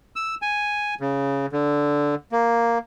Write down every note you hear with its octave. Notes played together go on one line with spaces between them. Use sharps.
E6
G#5
C#3
D3
A#3